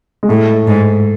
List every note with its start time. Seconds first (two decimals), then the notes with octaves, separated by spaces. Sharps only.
0.23 G#3
0.29 A2 A3
0.67 G#2